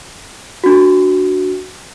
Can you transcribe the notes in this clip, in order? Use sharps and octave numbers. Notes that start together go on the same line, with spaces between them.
D4 F#4